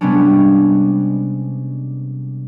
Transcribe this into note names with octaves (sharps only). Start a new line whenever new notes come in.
C3 G3 G#3 B3 C#4 D4